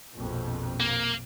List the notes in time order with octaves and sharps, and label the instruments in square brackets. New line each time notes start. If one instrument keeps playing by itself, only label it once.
[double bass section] A#1 F2 B2
[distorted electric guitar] A#3